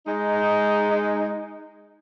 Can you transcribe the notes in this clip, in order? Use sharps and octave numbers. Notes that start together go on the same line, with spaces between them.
G#3 D#4